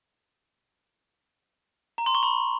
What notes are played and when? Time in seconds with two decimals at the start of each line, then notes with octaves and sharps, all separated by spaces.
1.98 A#5
2.06 C6
2.15 C#6
2.23 B5